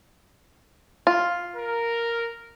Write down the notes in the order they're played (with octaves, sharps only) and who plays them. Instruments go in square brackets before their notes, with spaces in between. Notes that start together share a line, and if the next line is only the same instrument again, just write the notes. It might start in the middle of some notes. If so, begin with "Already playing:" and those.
[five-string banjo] F4
[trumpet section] A#4